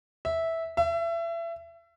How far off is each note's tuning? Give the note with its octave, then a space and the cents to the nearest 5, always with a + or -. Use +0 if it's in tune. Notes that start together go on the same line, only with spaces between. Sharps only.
E5 -10
E5 +30